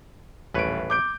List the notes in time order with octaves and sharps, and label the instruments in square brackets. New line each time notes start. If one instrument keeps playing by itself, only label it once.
[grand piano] D#1 D7 [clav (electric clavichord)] A1 B4 C#5
[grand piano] D6 G6 D7